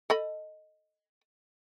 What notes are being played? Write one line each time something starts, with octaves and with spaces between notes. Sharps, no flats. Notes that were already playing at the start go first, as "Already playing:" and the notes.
A4 D#5 B5